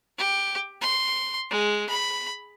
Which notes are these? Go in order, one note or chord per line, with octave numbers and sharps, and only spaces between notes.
G4
C6
G#3
B5